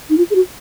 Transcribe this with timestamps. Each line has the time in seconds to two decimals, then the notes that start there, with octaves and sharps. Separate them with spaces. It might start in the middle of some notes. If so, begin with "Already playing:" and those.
0.10 D#4
0.17 F4
0.30 G#4
0.35 F#4